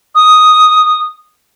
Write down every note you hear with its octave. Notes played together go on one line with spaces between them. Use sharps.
D#6